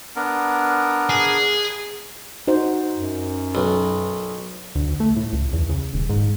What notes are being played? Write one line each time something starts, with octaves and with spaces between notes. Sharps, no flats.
B3 D4 A#4
G#4
D#4 F#4 C5
F#2
B1
D2
A3
A2
C#2
E2
C#3
D#1
G#2